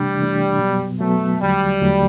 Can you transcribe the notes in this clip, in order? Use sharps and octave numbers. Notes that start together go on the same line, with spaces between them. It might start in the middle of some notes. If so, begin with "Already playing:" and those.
Already playing: C3 E3 G3 A3 D4
C3 E3 A3 D4
B2 F#3 B3
B2 F#3 A3 B3
E2 D3 F#3 G3 A3
E2 D3 F#3 A3